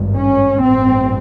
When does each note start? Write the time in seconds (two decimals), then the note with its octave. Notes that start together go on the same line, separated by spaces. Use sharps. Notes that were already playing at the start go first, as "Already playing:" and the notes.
Already playing: G#1 G2
0.16 C#4
0.62 A1 G2 C4